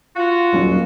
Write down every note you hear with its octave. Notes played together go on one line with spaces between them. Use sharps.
F4 F#4
D#1 F#3 C#4